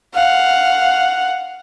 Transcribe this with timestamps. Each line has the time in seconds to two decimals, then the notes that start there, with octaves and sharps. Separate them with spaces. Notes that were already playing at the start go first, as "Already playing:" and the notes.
0.14 F5 F#5